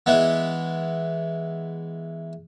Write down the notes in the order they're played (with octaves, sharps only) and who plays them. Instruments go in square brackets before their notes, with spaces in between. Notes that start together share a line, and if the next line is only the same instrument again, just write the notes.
[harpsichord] E3 G#3 B3